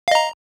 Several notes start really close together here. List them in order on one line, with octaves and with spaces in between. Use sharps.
F5 D#5 A#5